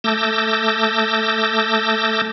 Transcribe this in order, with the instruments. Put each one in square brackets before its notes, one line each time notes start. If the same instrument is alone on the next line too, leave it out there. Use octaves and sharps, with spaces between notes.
[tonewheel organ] A3 A5 D6 E6 G6 A#6